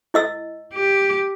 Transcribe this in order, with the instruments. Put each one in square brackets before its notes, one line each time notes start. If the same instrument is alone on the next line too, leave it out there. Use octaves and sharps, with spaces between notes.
[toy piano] E4 D#5 E6
[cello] G4